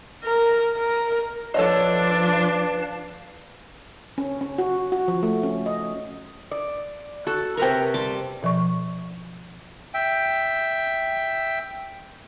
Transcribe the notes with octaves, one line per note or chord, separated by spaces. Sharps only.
A#4
A#4
F3 D4 A4 B4 C#5 D#5 F5 A5
C#4
C#4
F#4
F#4
F3
A3
C#4
D#5
D5
F#4 A4
C3 A#4 B4 G5 A#5 C#6
G3 A5 C6
B2 F3 D5 C#6
E5 G5